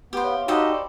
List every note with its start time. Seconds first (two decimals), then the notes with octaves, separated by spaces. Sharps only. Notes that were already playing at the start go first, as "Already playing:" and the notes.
0.13 B3 G4 C5
0.24 C#5 E5 F5
0.48 D#4 F#4 G4 A4 C5 D#5 G5 B5
0.71 D5